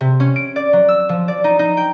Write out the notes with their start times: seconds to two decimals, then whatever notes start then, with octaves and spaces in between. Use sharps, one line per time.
0.01 C3
0.20 C#4
0.36 D7
0.56 D5
0.73 F#3
0.88 E6
1.09 F3
1.28 D5
1.44 D#4
1.59 D#4
1.77 G5